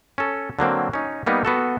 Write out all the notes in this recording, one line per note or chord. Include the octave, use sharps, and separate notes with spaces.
C#4 A4
D3 F#3 A#3 C4
C#4 D#4
G3 A#3 B3 D#4
B3 F#4 A4